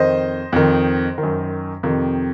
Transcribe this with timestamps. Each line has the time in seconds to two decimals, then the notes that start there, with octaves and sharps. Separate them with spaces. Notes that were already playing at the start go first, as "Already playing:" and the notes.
Already playing: F2 D#3 C5 D#5
0.52 F2 D#3
1.18 D#3
1.23 F#2
1.83 F2 C3 D#3